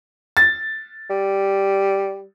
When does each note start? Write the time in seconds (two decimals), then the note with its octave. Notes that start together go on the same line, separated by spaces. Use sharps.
0.37 A6
1.10 G3